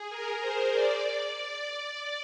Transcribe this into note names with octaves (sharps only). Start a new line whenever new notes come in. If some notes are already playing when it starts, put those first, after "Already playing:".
Already playing: G#4
A#4
C5
D5